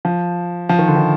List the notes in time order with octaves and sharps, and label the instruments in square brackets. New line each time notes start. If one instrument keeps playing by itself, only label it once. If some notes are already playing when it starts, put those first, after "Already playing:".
[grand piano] F3
F3
D#3
D3
D#3